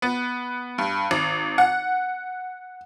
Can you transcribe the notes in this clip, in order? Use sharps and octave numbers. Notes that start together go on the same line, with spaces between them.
B3
G2
G#1
F#5